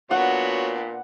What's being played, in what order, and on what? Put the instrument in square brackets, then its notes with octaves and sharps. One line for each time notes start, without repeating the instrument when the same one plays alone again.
[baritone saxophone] A#2 [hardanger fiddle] B3 D4 [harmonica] F#4 C#5 [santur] F#5